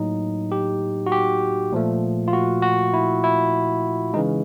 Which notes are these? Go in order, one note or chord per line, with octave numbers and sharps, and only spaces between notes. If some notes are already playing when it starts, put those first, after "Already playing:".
Already playing: A2 F#3 A#3 D#4
G4
F#4
G4
A#2 F3 A3
F4
F#4
F#4
E4
E4
C#3 E3 G#3 D#4